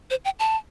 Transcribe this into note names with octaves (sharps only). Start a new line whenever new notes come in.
C5
G5
A5